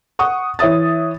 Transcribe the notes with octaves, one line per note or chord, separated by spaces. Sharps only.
F#5 C#6 D#6
E3 C#5 E5 D#6 A6